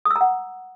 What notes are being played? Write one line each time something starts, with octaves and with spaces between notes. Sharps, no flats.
D#6
E6
A#5
F#5